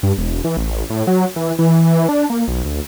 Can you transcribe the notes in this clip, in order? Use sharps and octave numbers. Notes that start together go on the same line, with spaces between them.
G2
E1
E3
A1
A2
F#3
E3
E3
D4
A#3
B1
D2